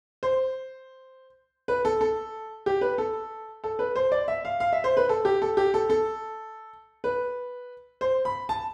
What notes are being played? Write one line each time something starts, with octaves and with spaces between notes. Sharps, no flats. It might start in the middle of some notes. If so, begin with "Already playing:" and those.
C5
B4
A4
A4
G4
B4
A4
A4
B4
C5
D5
E5
F5
F5
E5
C5
B4
A4
G4
A4
G4
A4
A4
B4
C5
B5
A5